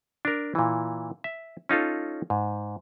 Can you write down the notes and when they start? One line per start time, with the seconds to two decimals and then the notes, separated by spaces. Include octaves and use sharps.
0.25 D4 A#4
0.55 A#2 E3
1.24 E5
1.69 C#4 D#4 F4 A4
2.30 G#2